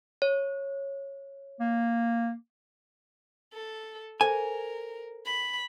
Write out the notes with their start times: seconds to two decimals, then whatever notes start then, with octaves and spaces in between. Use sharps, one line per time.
0.22 C#5
1.60 A#3
3.53 A4
4.21 A4 A#4 C5 G#5
5.25 B5